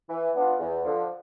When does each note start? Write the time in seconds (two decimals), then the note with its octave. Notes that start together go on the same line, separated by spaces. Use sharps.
0.09 E3
0.34 B3 D4 F4
0.59 E2
0.84 D3 F3